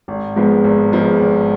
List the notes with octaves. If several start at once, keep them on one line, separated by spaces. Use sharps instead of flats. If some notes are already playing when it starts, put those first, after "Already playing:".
G#1
G#2 F3 G#3 B3
G#1
G#2 F3 G#3 B3
G#1